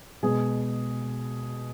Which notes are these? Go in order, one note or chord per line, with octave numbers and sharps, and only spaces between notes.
B2 G#3 G#4